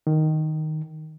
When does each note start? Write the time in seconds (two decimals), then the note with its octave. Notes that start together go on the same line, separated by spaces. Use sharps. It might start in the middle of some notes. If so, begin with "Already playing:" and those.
0.07 D#3